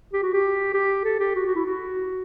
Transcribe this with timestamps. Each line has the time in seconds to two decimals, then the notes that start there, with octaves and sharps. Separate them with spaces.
0.13 G4
0.23 F#4
0.33 G4
0.74 G4
1.04 A4
1.20 G4
1.35 F#4
1.46 F#4
1.56 E4
1.66 F#4